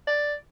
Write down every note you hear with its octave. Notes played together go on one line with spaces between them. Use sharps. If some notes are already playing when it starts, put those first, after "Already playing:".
D5